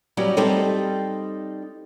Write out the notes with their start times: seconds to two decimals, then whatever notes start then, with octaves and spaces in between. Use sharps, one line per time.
0.17 F#3 G3 B3 C#4
0.37 G3 C4 D#4 A4